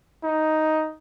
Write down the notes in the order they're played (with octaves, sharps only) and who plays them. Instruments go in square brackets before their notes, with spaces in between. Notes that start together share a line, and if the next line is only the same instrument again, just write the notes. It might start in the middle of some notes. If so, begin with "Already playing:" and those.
[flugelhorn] D#4